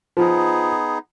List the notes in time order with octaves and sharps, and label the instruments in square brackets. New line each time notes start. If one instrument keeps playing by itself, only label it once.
[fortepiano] F3 [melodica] B3 D#4 G#4